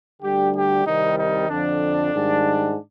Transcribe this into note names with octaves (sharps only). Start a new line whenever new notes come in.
D2 D3 G3 G4
G4
C2 C3 D#3 G3 D#4
D#4
F2 D3 F3 D4
G#2 D#3 G3